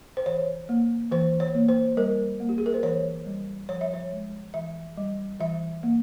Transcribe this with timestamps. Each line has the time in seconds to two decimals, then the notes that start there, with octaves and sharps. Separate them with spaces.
0.17 C5
0.26 E3 C#5
0.69 A#3
1.11 E3 C5
1.40 C#5
1.55 A#3
1.69 C5
1.97 G3 A#4
2.40 A#3
2.49 G4
2.58 G#4
2.66 A#4
2.74 C5
2.83 E3 C#5
3.26 G3
3.69 F3 C#5
3.81 E5
3.94 C#5
4.12 G#3
4.54 E3 E5
4.97 G3
5.40 E3 E5
5.83 A#3